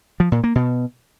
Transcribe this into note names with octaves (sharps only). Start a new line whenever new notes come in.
F3
A#2
A#3
B2